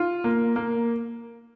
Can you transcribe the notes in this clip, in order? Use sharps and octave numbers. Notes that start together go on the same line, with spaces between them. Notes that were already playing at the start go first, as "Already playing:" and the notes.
Already playing: F4
A#3
A#3